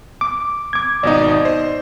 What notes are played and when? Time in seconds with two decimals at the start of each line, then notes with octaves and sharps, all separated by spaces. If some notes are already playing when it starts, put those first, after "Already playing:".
0.21 D6
0.73 D6 G#6
1.03 G#1 B2 D#4 D5 D#5
1.45 C5